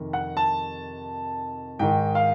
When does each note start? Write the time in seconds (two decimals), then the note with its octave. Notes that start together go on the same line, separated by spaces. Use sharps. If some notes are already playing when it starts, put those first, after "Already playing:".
Already playing: F2 C3 D#3
0.13 F#5
0.37 A5
1.79 G#2 D#3 G5
2.15 F5